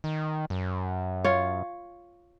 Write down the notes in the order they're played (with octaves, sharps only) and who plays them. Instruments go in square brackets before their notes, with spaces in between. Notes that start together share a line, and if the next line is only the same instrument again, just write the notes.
[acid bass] D#3
F#2
[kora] F4 C#5